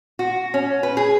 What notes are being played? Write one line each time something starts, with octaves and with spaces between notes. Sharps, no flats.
F#4
C#4
B4
G#4